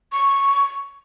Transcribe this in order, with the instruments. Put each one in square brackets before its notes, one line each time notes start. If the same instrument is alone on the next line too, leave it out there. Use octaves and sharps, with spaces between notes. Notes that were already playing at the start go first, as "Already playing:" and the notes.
[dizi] C#6